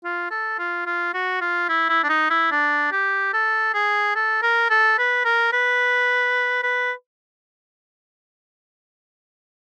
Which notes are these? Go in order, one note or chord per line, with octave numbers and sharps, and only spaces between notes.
F4
A4
F4
F4
F#4
F4
E4
E4
D4
D#4
E4
D4
G4
A4
G#4
A4
A#4
A4
B4
A#4
B4
B4